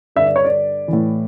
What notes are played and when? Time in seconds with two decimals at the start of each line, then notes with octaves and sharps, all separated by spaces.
0.16 G2 D3 E5
0.26 D5
0.36 C#5
0.45 D5
0.88 A2 E3